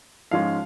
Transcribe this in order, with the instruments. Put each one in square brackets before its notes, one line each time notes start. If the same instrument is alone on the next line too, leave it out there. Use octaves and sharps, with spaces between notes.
[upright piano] G#2 F3 G#3 C#4 F4 F5